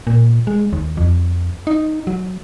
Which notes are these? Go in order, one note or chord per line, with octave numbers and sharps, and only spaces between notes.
A#2
G#3
D#2
F2
D#4
F#3